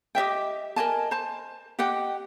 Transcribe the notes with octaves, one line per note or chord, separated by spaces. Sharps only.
G4 D#5 E5 G5
A#4 D#5 G#5 A5
C5 A5
G4 D#5 F#5 G5